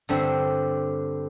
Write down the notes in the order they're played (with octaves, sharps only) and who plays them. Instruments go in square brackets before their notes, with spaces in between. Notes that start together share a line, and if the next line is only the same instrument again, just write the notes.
[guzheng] G2 D3 G3 C4